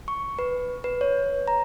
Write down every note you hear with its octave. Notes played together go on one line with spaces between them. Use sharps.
C#6
B4
B4
C#5
A#5